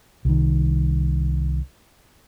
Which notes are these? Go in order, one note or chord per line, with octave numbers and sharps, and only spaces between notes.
C2 D#3